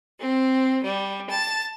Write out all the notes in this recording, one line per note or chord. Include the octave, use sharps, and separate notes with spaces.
C4
G3
A5